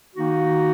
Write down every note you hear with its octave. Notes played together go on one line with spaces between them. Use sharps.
D#3 A#3 D#4 F#4